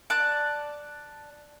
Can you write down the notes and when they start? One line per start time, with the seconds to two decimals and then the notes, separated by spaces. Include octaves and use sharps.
0.10 D5 A5 F#6